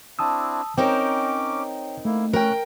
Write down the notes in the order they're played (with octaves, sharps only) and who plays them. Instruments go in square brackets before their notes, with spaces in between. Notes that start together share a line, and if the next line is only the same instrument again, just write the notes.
[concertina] C4 D4 E4 [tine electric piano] A5 D#6 E6
[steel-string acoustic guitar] C4 D#4 A#4 [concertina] C#4 D6 [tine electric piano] C#5 G5
[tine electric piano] A3 [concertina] A#3 E4
[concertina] C#4 F#6 [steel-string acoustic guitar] A#4 G5